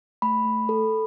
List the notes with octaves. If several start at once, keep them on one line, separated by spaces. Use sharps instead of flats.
A3 B5
A3
A4